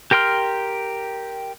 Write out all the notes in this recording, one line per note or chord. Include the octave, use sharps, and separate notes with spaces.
G4 A#4 G5 C6 F6